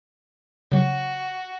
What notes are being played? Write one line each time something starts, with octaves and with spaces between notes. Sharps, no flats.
C#3 F#3 F#4